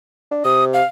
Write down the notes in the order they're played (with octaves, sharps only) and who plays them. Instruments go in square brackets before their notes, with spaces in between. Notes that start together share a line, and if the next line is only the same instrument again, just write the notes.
[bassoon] D4
[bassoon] C3 [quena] D#6
[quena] F5